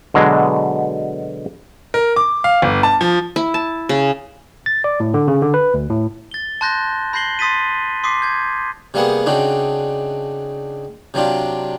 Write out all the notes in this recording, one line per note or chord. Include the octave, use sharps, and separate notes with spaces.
B2 D3 F#3 G#3
A#4
D6
F5
G1
A5
F3
E4
A5
C#3
A6
D5
A2
D3
C#3
D3
B4
D2
A2
A6 G7
A5 C6 F#6 G6 A#6
B5 G6 A#6 C7 F#7 G7
C6 D#6 A6 B6 D#7
C6 D6 D#6 B6 C7
G6 G#6
C3 G3 A#3 B3 G#4 F#5
C#3 C4 D4 D#4 F#4
C3 F#3 C4 D4 F4